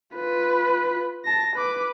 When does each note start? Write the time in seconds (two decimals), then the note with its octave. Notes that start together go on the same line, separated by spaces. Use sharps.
0.15 F4 B4
1.25 A5 A#6
1.55 B4 D6